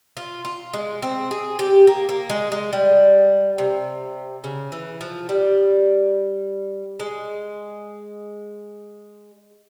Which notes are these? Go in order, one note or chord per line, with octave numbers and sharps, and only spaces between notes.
F4
F4
G#3
C4
G#4
G4
A#3
A#3
G#3
G#3
G3
C3
C#3
E3
F3
G3
G#3